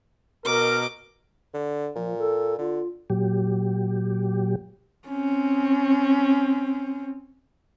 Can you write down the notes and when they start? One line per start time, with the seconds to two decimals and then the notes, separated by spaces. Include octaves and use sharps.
0.45 B2 A#4 D#5 D6
1.54 D3
1.96 A#2 F3
2.18 A4
2.58 D3 F4
3.10 A#2 F#3 G4
5.08 C4 C#4